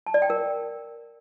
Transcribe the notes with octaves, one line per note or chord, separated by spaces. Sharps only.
A5
D5
G5
A#4